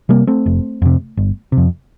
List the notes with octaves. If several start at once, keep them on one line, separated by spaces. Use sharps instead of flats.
C3 G3 A#3
A3 C4
F1
F2 C3
G1
C3
F2